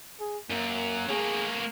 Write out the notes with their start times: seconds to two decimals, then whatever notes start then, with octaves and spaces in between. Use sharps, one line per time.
0.20 G#4
0.50 F#2 A#3
1.09 A3 A#3 G#4